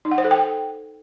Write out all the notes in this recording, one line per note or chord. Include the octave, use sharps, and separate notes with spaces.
D#4
F#5
C5
A4
G5